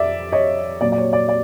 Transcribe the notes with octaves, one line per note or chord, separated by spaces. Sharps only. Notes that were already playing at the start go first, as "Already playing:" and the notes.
Already playing: F2 D5 E5
C#5 D#5
A#2 F#3 D5
D5
C#5
D5
D5